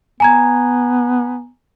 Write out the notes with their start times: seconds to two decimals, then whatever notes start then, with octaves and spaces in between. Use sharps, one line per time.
0.20 B3 G#5 A#5 G#6